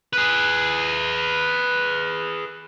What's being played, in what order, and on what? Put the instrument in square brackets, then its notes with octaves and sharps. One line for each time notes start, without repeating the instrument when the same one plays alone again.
[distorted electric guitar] G#4 B4